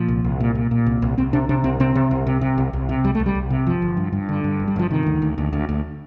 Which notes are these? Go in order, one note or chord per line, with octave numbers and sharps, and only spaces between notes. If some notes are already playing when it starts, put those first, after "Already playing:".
Already playing: A#2 F3
C2
C2
A#2
A#2
A#2
C2
C2
C2 C4
C3 D4
C3 D4
C2 C4
C3 C4
C3
C2
C3
C3
C2
C2
C3
C2 G3
C2 A3
G3
C2
C3
G1 F3
G1
G2
G2
D3
G2
G1
G3
G1 F3
C3 D#3
D2
D2
D2
D2
D2